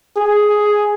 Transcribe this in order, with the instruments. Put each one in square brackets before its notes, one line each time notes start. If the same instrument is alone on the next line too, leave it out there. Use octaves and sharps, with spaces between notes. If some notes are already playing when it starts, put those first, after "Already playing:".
[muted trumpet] G#4